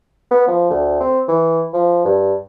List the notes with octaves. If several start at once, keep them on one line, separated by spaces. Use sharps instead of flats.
B3
F3
D2
C4
E3
F3
G2